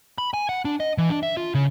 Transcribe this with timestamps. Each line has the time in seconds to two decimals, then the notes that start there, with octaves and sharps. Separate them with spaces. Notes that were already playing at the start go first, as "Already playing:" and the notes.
0.18 B5
0.34 G#5
0.49 F#5
0.65 D4
0.80 D#5
0.98 E3
1.10 D4
1.23 E5
1.37 F4
1.54 C#3